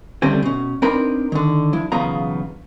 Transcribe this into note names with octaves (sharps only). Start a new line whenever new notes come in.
D3 G3 A3 C4 C#4
B2 C#4
C4 D4 D#4 A#4 B4 B5
D3 D#3
F3 E4
B1 E2 C#3 B3 F4 A#5